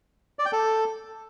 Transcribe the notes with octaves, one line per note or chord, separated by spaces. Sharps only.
D5
G5
A4